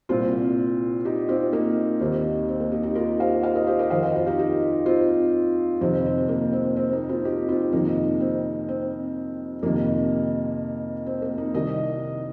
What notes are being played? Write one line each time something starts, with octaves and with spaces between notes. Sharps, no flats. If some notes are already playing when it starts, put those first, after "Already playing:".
C2 A#2 C4 F4
D#4 G4
C4 F4
A#3 D#4
D#2 D#3 C4
C4
A#3
D#4 G4
D#4 G4
F4 A#4
C5 F5
C5 F5
A#4 D#5
G4 C5
A#4 D#5
F2 D#3 C5 F5
C5 F5
F4 A#4
D#4 G4
D#4 G4
C4 F4
F2 C3 D#3 C4
C4
A#3
C4
C4
A#3 D#4
C4 F4
D#4 G4
C4 F4
F2 C3 D#3 A#3 D#4
C4
C4
F2 C3 D#3 A#3
C4
A#3
A#3 D#4
C2 C3 D#3 A#4 D#5